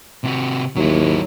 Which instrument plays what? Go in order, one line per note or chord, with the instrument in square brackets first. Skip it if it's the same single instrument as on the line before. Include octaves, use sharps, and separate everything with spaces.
[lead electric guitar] C3 F#4
[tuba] D#2 [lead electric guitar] F#3 E4